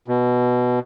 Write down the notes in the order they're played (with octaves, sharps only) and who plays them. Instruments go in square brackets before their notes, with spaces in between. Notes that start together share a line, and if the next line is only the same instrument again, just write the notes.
[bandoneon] B2